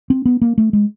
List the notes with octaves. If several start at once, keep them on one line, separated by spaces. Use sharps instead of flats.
C4
B3
A#3
A3
G#3